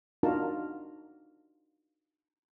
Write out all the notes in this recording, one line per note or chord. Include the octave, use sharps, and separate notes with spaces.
D4 D#4 F4 F#4 A#4 A5